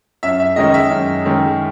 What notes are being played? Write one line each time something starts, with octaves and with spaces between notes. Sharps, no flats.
F#2 E5
E5
D#3 G#3 C#4 D#5
E5
F#2
D#3 G#3 C#4